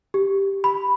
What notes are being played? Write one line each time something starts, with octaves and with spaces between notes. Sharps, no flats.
G4
B5